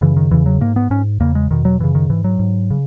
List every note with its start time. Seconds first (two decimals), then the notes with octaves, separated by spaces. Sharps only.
0.01 F#2 C#3 E3
0.17 D#3
0.31 E2 C#3 E3
0.46 F#3
0.61 G#2 A#3
0.76 B3
0.90 G#2 C#4
1.20 E2 C#3 A#3
1.35 G#3
1.50 E2 B2 D#3
1.65 F#3
1.80 F#2 C#3 E3
1.95 D#3
2.10 G#2 E3
2.24 F#3
2.39 G#2
2.71 C#3